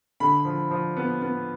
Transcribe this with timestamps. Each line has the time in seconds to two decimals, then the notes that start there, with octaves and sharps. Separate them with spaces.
0.20 D3 B5
0.45 F3
0.71 F3
0.97 B3
1.22 B3